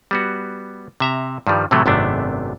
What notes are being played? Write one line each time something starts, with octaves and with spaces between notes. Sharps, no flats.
G3 B3 F#4
C3 E5 A#5
G2 D#3 F3 G3
A2 C3 E3 F#3 A3
G#1 F#2 C3 A3 B3 D4